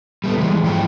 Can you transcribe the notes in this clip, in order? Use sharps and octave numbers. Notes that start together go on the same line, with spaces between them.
G3 A3 B3
E3 G3 G#3
G#2 F3 E4 G5